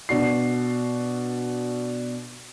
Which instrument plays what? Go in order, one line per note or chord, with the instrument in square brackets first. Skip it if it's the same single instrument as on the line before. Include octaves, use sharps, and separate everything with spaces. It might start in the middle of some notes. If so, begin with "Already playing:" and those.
[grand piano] B2 D4 F#4 C7